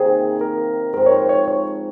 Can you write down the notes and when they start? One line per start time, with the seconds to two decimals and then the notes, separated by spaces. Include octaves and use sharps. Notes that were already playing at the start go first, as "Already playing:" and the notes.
Already playing: C3 D#3 A#3 G#4
0.41 A#4
0.94 G#2 F3 C4 A#4
1.06 C#5
1.11 C5
1.29 C#5
1.48 C#5